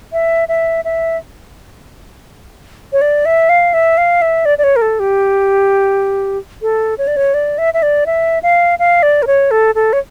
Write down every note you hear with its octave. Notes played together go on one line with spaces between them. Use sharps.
E5
E5
E5
C#5
D5
E5
F5
E5
F5
E5
D5
D5
C#5
A#4
A4
G4
A4
C#5
D5
C#5
D5
E5
E5
D5
E5
F5
F5
D5
A#4
C#5
A4
A4
C#5